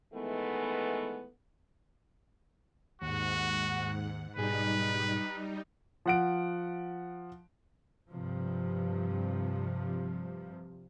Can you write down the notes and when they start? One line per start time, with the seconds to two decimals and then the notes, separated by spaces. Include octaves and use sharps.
0.13 D#3 E3 G#3 A3 B3
3.01 D#2 G#2 F#4 F#5
4.36 B1 G#2 G3 D#4 G#4 B4
6.06 F3 F#5 D7
8.10 G2 C3 F3